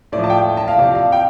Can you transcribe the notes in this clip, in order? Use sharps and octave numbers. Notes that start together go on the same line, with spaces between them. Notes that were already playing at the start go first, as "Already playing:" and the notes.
A2 D5
F3
A5
G5
A5
F5
C3 F3 D5
F5
G5